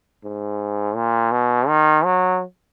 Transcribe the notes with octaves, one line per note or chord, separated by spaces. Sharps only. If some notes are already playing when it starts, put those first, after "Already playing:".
G#2
A#2
B2
D#3
F#3